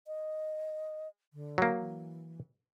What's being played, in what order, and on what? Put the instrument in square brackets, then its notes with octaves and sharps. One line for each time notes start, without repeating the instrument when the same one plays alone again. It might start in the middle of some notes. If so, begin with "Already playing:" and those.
[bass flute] D#5
D3
[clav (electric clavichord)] F#3 A#3
[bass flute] E3